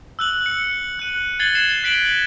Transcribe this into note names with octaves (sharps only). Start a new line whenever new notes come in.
E6 F#6 F#7
C#7
F#6 D#7
F#6 G#6 A6 C7 F#7 G7
C7 E7
F#6 B6 C7 D7 F#7 G7